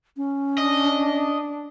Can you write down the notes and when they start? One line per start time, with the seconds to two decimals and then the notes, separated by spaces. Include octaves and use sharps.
0.17 C#4
0.58 D4 D#5